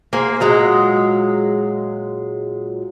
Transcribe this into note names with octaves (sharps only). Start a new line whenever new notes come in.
A#3 G#4 C5
A#2 F#3 G#3